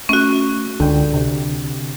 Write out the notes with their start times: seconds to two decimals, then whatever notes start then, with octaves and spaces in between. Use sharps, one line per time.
0.09 A3 C#4 F#4
0.80 C#2 D3 G5
1.14 C3